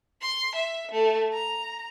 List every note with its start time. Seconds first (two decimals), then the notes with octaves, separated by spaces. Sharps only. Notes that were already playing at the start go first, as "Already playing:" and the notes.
0.21 C6
0.55 E5
0.91 A3
1.33 A#5